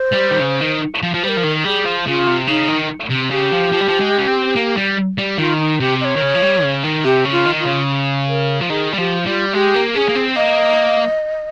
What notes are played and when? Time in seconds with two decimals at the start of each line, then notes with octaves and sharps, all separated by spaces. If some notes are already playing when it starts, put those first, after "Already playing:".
Already playing: C5
0.13 G3
0.31 D#3
0.41 C#3
0.61 D#3
1.03 F3
1.14 F3
1.24 G3 C5
1.29 A#4
1.37 F3
1.44 D#3
1.65 G3 G#4
1.86 F3
2.06 C#3 F4
2.27 C3
2.48 C#3 D#4
2.69 D#3
3.10 C3
3.31 C#3 G4
3.52 F3
3.72 F3
3.81 G3
3.88 F3
4.00 G#3
4.18 C#4
4.27 C4
4.56 A#3
4.77 G3
5.18 G3
5.38 D#3 F4
5.59 D#4
5.80 C3 G4
6.01 D#5
6.05 C#5
6.16 D#3
6.22 C#3
6.35 F3
6.42 G3
6.63 C#3
6.84 D#3
7.04 C3 G4
7.25 C#3
7.32 F4
7.46 D#3
7.60 F4
7.66 C#3
8.28 A#4
8.61 F3
8.70 D#3 G#4
8.93 G3
8.98 F3 G4
9.26 G3 F4
9.53 G#3 G4
9.74 A#3
9.95 C#4 G#4
10.08 A#3
10.15 C4
10.36 A#3 D#5